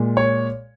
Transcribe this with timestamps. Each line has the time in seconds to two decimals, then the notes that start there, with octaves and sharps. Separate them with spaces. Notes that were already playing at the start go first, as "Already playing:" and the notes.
Already playing: A#2 G#3
0.17 C#5